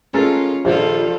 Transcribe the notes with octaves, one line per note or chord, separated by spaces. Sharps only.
G#3 C#4 F4 A4 A#4
A#1 D#3 F3 G3 D4 F4 A4